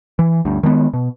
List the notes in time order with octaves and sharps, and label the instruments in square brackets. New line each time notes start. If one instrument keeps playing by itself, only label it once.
[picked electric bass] E3
D2 G2
D#3 G#3 A3 B3
B2